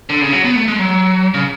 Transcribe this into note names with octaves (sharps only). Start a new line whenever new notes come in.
D3
C#3
F#3
B3
A3
G#3
F#3
C#3